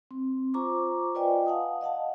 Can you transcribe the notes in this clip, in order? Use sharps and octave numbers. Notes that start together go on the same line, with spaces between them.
C4
F4 C5 A#5 C#6 D6
F4 B4 D5 D#5 G5 G#5
F5 F#5 G#5 A5 D#6
D#5 F5 F#5 A5